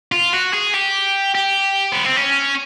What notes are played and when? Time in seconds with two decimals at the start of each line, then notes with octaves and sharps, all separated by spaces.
0.12 F4
0.33 F#4
0.53 G#4
0.73 G4
1.35 G4
1.92 B3
2.05 C4
2.17 C#4